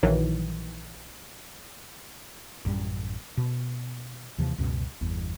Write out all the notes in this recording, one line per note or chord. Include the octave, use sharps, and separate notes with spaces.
A#1 D#3 E3 F#3
A1 F#2 G3
B2
D#2 C3 E3 F3
C#2 F#2 B2 C#4
G1 E2